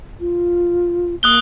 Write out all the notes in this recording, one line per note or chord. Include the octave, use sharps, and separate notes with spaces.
F4
A#3 D#6 F#6 G7